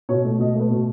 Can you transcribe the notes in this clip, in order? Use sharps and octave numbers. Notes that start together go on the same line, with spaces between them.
B2 C#5
A3
B2 D#5
A3 B4
B2